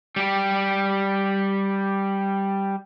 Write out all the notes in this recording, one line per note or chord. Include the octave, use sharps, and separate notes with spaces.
G3 G4